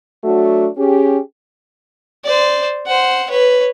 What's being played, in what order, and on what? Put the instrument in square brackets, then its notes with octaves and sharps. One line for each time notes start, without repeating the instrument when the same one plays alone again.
[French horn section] F#3 A3 D4 F#4
C#4 G4 G#4
[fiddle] C5 D5
C5 F#5
B4 C#5